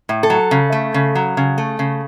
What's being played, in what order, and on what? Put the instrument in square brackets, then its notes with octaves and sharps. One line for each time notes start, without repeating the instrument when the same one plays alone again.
[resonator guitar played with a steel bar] A2
A4
F#3
C#3
A3
C#3
F#3
C#3
A3
C#3